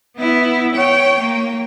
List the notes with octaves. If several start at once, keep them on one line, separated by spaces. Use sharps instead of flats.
B3 E4
C#5 G5
A#3